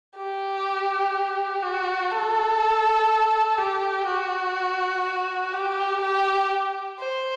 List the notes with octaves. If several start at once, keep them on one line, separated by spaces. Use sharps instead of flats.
G4
F#4
A4
G4
F#4
G4
G4
C5